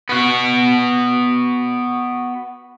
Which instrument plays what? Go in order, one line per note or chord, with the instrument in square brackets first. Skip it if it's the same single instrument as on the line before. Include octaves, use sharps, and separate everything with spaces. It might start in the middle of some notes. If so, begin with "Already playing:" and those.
[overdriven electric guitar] B3 F#4